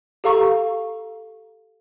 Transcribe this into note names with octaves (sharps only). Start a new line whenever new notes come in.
G4 A4 F5 A#5 C#6